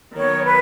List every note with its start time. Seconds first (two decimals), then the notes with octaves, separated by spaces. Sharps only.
0.16 D#3 F#3 B3 C#5
0.45 B4